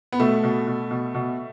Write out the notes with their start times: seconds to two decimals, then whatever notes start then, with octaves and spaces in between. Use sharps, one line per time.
0.12 B3
0.19 B2 A3
0.43 B2
0.67 B2
0.91 B2
1.14 B2